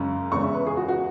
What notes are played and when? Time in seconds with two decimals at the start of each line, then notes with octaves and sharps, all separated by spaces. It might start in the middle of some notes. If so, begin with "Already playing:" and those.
Already playing: F#2 C#3 G#3 C#4
0.32 E2 C#3 G#3 C#4 C#6
0.43 E5
0.54 B4
0.67 G#4
0.77 F#4
0.88 F#4